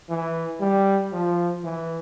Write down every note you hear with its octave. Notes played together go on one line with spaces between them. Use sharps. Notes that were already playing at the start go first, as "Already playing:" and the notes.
E3
G3
F3
E3